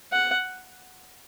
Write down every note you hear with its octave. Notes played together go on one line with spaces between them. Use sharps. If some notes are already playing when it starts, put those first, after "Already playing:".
F#5